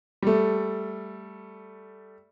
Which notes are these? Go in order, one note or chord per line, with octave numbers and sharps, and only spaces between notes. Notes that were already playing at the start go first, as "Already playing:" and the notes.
G3 A3